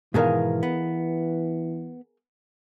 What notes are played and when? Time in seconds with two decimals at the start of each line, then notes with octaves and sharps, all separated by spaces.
0.14 G#2 B2 D#3 E3 G#4 A#4 F5
0.63 B3